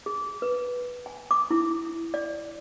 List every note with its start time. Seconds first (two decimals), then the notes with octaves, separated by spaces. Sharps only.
0.06 G#4
0.42 B4
1.06 G#5
1.31 D6
1.51 E4
2.14 D5